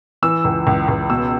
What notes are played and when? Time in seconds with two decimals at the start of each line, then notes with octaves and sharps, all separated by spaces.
0.23 E3 E6
0.45 C#2
0.67 C#2
0.88 C#2
1.10 B2 E6